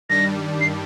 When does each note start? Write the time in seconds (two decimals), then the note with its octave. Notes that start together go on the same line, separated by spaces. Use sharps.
0.09 G2 D#3 G3 D4 A#6
0.61 C7